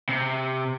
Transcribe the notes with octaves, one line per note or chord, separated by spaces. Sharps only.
C3